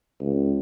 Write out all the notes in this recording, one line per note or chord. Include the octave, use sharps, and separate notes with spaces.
C#2